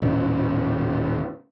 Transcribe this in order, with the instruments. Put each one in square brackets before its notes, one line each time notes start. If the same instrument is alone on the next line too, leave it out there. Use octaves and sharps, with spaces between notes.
[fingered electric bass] D#1 A2 C#4